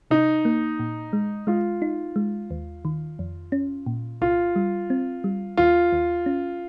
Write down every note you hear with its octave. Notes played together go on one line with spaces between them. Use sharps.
C3 D#4
A#3
A#2
G#3
G#3 F4
D#4
G#3
D#2
D#3
F2
C#4
A#2
C2 F4
G3
C4
G3
D#2 F4
D#2
C#4